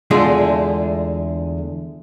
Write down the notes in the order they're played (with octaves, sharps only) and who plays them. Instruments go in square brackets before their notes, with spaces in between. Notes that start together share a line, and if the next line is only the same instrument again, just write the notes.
[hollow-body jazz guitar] E2 D3 G#3 A3 F4 G#4